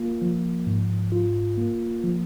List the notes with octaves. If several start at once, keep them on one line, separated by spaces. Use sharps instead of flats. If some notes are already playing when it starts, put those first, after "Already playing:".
Already playing: A#3 F4
F3
G#2
F4
A#3
F3